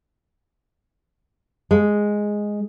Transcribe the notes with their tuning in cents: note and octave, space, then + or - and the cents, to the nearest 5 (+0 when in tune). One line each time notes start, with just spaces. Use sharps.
G#3 +0